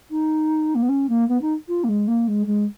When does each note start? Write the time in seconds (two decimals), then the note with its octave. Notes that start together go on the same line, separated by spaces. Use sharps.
0.11 D#4
0.75 A#3
0.82 B3
0.89 C#4
1.09 A#3
1.28 B3
1.42 D#4
1.68 F4
1.84 A#3
1.89 G#3
2.08 A#3
2.28 G#3
2.47 G#3